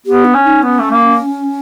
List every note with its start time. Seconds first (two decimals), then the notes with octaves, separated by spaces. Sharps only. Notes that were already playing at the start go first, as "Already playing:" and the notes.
0.06 B3 G4
0.25 D4
0.34 C#4
0.44 D#4
0.63 B3 C#4
0.79 A3
0.90 A#3